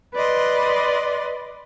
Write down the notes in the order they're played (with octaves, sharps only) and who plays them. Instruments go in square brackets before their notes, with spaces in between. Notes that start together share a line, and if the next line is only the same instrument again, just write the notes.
[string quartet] B4 D5 D#5 C6